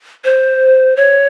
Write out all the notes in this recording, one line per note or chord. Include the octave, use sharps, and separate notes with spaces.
C5
C#5